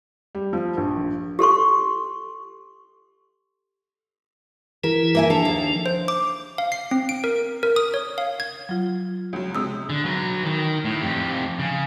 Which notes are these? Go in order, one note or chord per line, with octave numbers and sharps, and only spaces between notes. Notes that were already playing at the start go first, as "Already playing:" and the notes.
G3
F3
A#1
G4 A4 C6 C#6
E3 E4 G#4 A#4
A#3 E5 G#5
F3 D4 A4
D#2
C5
D6
F5
C7
C4
D7
A#4
A#4
D#6
C#5
F5
G#6
F#3 F4
C#2 F#3
C3 G#3 D#6 E6
D3
F#3 B4
D#3
A2
F2 G4
C#3